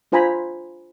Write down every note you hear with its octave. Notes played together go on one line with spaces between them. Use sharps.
D4 F4 C5 G#5 A#5 B5